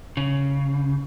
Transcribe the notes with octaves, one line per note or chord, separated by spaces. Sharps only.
C#3